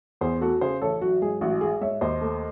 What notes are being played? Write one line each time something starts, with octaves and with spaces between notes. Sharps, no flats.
E2 G#4 C5
A3 F#4 A4
C#3 G#4 C5
A1 A4 C#5
F#3 F#4
G#2 G#4
A1 F#4
G#3 G#4
G#2 C#5 E5
D#2 C5 D#5
A3